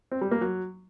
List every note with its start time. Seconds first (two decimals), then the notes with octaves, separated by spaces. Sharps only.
0.11 C4
0.21 G3
0.31 A#3
0.41 F#3